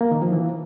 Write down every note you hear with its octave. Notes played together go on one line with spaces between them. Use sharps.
A#3
D#3
F3
E3